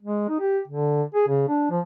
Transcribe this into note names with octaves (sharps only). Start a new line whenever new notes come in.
G#3
D#4
G4
D3
G#4
C#3
D4
F3